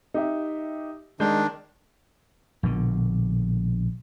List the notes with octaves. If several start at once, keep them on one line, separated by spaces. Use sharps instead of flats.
D#4 G4 E5
D#3 G#3 D4 G6
A#1 B2 D3